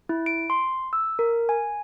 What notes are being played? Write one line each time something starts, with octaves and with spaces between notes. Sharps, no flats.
E4
D7
C6
E6
A#4
G#5